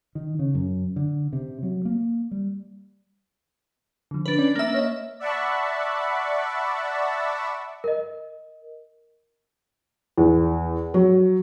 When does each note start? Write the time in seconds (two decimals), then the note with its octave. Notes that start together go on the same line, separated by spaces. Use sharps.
0.15 D#3
0.39 C#3
0.55 F#2
0.96 D3
1.33 C3
1.63 F#3
1.85 A#3
2.31 G3
4.11 D3 F3
4.26 D4 B4
4.38 C#4 D5
4.56 A#3 E5
4.74 C#5 D#5
5.20 D5 E5 F#5 A5 B5 C#6
7.84 A#4 D#5
10.18 E2
10.94 F#3